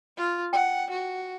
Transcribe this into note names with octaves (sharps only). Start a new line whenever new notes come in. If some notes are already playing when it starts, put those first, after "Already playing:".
F4
F#5 G5
F#4